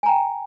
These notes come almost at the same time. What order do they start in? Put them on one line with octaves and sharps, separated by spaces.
G#5 A#5 G5